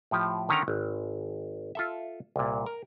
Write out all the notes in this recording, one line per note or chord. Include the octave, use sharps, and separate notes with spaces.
A2 F3 G4
D3 D#3 C#4 A#5
G#1
F4 A4 E5
C2 A#2
A#4